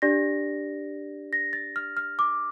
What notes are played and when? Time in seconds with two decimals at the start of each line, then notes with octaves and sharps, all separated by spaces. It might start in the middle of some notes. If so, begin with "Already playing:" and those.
0.02 D4 G4 D5 A#6
1.33 A#6
1.53 A6
1.76 F6
1.97 F6
2.19 D6